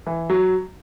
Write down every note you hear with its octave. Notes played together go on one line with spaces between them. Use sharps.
E3
F#3